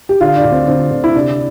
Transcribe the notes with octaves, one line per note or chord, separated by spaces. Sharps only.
G4
D3 F4
D4
D2
C4
D2 C4
D3
E4
C3 D4